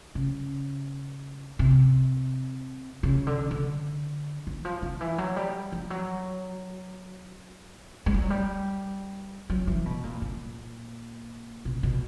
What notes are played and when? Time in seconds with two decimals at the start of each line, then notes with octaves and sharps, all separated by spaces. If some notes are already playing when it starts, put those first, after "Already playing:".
0.15 C#3
1.59 C3
3.03 C#3
3.27 D3
3.51 D3
4.47 E3
4.65 F3
4.82 D#3
5.01 E3
5.18 F#3
5.36 G3
5.72 F3
5.90 F#3
8.06 G#3
8.14 G3
8.22 F#3
8.30 G3
9.50 F#3
9.67 E3
9.85 B2
10.04 A#2
10.22 A#2
11.65 B2
11.83 B2